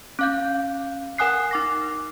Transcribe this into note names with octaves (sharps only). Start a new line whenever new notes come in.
C#4 F5 G6
A#4 F#5 G#5 D#6 F#6 C7
D#4 D6 A#6